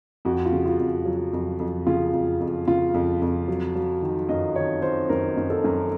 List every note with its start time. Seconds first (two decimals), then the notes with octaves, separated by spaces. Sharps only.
0.25 F2 F#4
0.46 F4
0.52 C#3
0.66 F4
0.79 F2
1.05 F#3
1.33 F2
1.59 F2
1.87 C#3 F4
2.14 F2
2.40 F2
2.67 C#3 F4
2.94 F2
3.22 F2
3.48 F#3
3.75 F#3
4.02 D#3
4.29 F#2 D#5
4.56 D#3 C#5
4.82 D#3 C5
5.09 F#2 A#4
5.37 F#2
5.50 A4
5.64 F#2